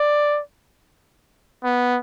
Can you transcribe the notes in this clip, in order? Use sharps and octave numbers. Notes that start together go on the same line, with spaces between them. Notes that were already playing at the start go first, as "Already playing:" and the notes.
Already playing: D5
B3